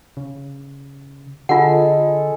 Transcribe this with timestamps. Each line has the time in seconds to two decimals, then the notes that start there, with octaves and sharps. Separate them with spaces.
0.17 C#3
1.49 D3 G#3 F4 A4 F#5